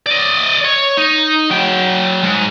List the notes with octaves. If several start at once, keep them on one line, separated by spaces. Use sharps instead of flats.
D5 D#5
C#5
D#4
F#3 G5
G#2